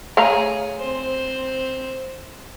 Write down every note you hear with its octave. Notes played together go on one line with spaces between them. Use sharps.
A3 G#4 C#5 F5 A#5
C4 C5